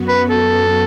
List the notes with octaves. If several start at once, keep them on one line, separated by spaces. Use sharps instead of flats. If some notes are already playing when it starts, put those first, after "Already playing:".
Already playing: F#2 F#3 B3 F#4
B4
A4